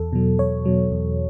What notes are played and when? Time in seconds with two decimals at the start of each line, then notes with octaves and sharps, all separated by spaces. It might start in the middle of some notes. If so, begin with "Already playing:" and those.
Already playing: E2 A4
0.13 B2 F#3
0.39 E2 C#5
0.65 B2 F#3
0.91 E2